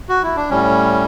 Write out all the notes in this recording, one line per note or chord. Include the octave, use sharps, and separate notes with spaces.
F#4
E4
D4
A2 G3 C#4